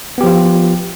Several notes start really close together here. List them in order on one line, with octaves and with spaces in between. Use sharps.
B3 G4 F3 F4